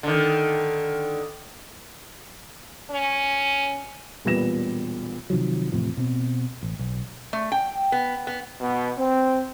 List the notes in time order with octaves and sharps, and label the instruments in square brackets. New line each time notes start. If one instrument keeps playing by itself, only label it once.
[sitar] D3 D#3
[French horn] C#4
[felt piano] E1 A#2 G3 B4 A#6 E7
[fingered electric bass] C3 D#3 F3 F#3
E2 A2 C3 F3
B2 C4
A1
B1
[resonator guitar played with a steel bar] A3
G5
B3
B3
[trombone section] B2
C4